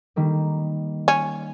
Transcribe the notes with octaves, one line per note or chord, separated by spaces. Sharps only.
D#3 G3 A#3
C#4